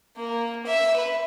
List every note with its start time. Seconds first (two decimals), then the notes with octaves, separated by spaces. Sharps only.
0.16 A#3
0.66 E5
0.96 B4